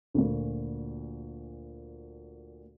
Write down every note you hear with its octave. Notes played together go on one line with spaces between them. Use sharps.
D2 A#2